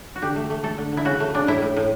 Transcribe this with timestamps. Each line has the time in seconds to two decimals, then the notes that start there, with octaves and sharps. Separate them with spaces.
0.16 F#4
0.22 D3 G4
0.36 A3
0.50 A3
0.63 A3 A4
0.78 D3
0.92 D3 E4
1.05 C#3 F#4
1.20 A3
1.34 C#3 D4
1.47 A2 E4
1.62 A2
1.76 A2